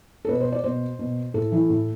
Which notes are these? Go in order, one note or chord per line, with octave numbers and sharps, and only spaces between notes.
A4
B2 B4
C5
D5
B2 C5
B2
A2 A4
E3
A2